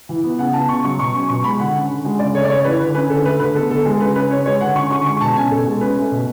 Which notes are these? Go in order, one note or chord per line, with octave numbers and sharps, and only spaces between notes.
E3
B3
C#3 F#5
B3 A5
C#3 C#6
F#3 C#6
B2 C#6
C#4
B2 C#6
G#3 B5
D3 F#5
C#4
D3
G#3
C#3 D5
A3 C#5
D5
C#3 C#5
E3 B4
D3 B4
C#4 B4
D3 A4
A3 B4
D3 B4
B3 A4
D3 A4
G#3
C#3 B4
C#4 B4
C#3 C#5
G#3 C#5
D3 F#5
C#4 C#6
D3 C#6
G#3 C#6
B2 A5
C#4 G#5
B2 A4
G#3
C#4 B4
A3
B2